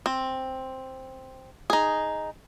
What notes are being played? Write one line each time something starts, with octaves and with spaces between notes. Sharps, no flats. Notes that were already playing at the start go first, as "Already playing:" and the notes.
C4
D#4 G#4